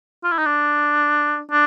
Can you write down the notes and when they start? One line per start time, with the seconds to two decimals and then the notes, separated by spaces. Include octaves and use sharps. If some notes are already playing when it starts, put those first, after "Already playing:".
0.24 F4
0.32 E4
0.38 D#4
0.46 D4
1.51 D4